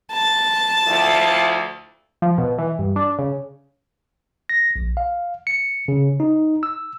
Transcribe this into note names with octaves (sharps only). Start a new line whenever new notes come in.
A5
D2 F3 E4
F3
B2
E3
G2
D4
C#3
A#6
A#1
F5
C#7
C#3
D#4
E6